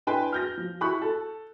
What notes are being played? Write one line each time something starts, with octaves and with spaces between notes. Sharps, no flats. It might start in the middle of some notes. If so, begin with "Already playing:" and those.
D4 E4 B4 G5 G#5 C6
F6 G6 A#6
F3
E4 B5 C#6 F#6
A4